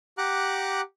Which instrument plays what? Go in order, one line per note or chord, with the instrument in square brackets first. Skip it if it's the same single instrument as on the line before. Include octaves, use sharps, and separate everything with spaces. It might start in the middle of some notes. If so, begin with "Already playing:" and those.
[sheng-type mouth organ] G4 F#5 A#5 D6 F#6